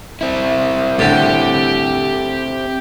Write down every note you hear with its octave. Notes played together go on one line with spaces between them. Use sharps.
C4 E4
A2 D3 G4 G5